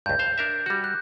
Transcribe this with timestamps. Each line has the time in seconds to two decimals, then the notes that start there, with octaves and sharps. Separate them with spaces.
0.06 C#2 G2 G6
0.19 C5 F5
0.38 D4 A#4 E5
0.66 G3 F#4
0.84 F#6